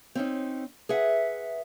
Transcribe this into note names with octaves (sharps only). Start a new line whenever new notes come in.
C4 C#4 D#4
G#4 B4 E5 F#5